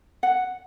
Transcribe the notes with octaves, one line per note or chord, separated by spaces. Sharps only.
F#5